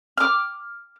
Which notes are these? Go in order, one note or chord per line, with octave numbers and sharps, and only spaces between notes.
D6 F6